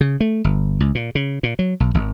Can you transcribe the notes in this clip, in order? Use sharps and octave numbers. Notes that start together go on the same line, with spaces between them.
C#3
A3
G1
C#2
A#2
C#3
A#2
F#3
B1
G#1